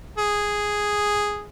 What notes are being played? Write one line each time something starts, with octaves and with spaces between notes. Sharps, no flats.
G#4